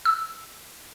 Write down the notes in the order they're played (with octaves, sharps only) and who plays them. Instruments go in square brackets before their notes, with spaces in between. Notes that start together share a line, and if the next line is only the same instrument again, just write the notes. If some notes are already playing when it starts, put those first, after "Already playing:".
[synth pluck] E6